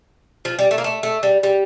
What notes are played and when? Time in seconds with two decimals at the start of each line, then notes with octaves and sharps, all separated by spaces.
0.45 F3
0.59 G3
0.71 A3
0.78 A#3
0.84 A3
1.03 A3
1.23 G3
1.43 G3